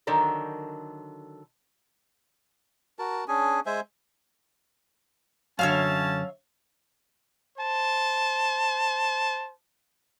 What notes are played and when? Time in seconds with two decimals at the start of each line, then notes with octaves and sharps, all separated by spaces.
0.07 D3 D#3 F#3 A4 A#4
2.99 F#4 A#4 A5
3.28 C#4 D4 G#4 G#5
3.66 G#3 C5 E5 G#5
5.59 F#2 D3 C#4 C#5 E5 F5 A5
7.58 C5 A5